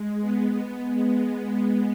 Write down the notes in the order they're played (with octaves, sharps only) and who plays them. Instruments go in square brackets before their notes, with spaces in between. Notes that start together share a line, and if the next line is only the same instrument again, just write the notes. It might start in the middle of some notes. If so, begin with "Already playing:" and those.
Already playing: [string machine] G#3
B3
G#3